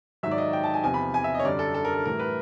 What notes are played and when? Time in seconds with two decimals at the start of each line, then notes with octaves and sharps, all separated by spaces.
0.23 G#2 D#3 F#3 E5
0.31 D5
0.38 D#5
0.53 G5
0.64 A5
0.74 G#5
0.84 E2 C3 F3 G#5
0.94 B5
1.14 G#5
1.24 E5
1.34 D#5
1.40 C#5
1.45 F#2 D3 G3 D5
1.59 A4
1.74 A4
1.85 A#4
1.95 A4
2.06 A2 E3 G3 A#4
2.20 B4